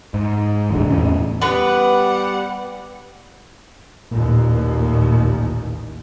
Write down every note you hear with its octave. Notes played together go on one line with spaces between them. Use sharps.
G#2
D#1 A1 D3
E2 A2 E3 C#4
G3 B3 B4 D5 F#5
A1 D#2 A#2